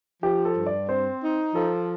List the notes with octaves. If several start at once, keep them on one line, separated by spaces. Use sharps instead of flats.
F3 G4
A4
G2
D5
C4 C5
D#4
F3 A4